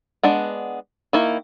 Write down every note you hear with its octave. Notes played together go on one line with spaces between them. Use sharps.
G#3 B3 D4 F#5
D#3 A#3 E4